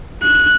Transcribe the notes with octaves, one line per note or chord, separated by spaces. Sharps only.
F#6